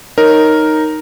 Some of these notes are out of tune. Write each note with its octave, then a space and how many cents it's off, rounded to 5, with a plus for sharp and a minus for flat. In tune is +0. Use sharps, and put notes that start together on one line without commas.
D#4 +0 A#4 +0 C#5 -5